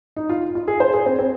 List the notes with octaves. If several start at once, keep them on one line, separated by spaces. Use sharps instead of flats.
D#4
F4
F4
G#4
C5
G#4
C4
C4